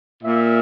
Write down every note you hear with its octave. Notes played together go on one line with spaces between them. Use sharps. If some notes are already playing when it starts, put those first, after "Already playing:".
A#2 A#3 E5